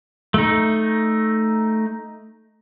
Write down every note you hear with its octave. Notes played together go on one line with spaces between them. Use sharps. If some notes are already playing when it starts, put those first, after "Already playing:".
A3 D#4